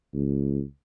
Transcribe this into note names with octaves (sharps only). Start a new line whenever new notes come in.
C#2